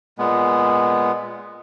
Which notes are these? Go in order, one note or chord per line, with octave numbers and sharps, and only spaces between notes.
A#2 G#3 B3